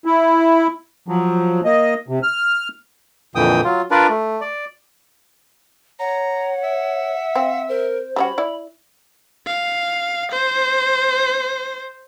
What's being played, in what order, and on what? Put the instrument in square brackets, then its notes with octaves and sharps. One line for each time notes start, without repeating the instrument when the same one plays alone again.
[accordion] E4
F3 F#3
A#3 D#5
C3
F6
[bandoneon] F2 A#2 D3 E3 G5 D#6
F#3 F4
D4 F4 A#4 B4 D5
A3
D5
[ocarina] C#5 [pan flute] F#5 [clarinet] A#5
[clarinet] E5
[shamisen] C4 [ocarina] F5
[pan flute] A#4 [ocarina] C5
[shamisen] G3 C#4 F#4 [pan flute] B5
[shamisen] E4 D5
[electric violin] F5
C5